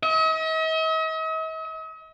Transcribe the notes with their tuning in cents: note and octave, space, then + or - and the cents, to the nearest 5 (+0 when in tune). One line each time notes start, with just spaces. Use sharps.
D#5 +45